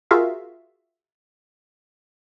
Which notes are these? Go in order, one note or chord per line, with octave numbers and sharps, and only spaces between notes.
F4 F#4 G#4 A#4 E5 F5